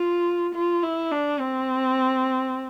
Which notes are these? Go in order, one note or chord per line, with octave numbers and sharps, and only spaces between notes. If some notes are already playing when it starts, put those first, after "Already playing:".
Already playing: F4
F4
E4
D4
C4